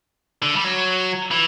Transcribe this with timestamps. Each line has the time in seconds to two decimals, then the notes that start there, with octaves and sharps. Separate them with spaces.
0.43 D3
0.56 G3
0.65 F#3
1.31 E3